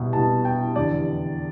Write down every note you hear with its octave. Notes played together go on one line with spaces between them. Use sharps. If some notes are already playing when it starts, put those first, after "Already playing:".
Already playing: C2 B2
C2 B2 A5
G5
F1 E2 D3 D5